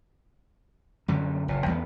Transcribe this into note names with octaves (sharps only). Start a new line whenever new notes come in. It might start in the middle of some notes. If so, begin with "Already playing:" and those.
F#2 D3 G3
F#1 A#2
E2 G3 B3